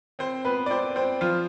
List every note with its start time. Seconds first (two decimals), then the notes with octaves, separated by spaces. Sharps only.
0.19 C4 C5
0.45 B3 B4
0.66 D5
0.70 C4 C5
0.96 C4 C5
1.21 F3 F4